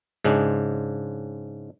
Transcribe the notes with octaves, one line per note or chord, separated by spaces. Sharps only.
G#2 C#3 G#3 D4